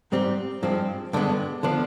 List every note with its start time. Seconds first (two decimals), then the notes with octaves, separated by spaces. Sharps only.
0.12 G#2 G3 C4 G4
0.63 G2 F3 G#3 C4
1.13 G2 D3 G#3 B3
1.63 D3 F3 B3 D4